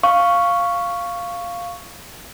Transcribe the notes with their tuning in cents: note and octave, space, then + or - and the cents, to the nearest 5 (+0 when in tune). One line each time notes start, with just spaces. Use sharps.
F5 +0 C#6 +0